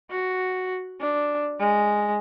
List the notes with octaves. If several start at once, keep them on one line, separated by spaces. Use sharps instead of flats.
F#4
D4
G#3